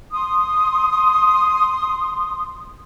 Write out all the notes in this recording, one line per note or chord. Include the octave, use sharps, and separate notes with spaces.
C6 D#6